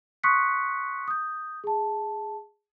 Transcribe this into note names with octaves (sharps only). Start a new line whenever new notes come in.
C6 C#6 D#6 F#6 B6 C#7
D#6 G6
G#4 A5